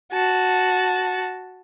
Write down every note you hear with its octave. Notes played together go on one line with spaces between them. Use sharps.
F#4 A5